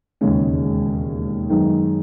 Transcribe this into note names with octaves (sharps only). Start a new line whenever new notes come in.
E1 D#2 C#3 G#3 C#4
F#2 D#3 G#3 B3 D#4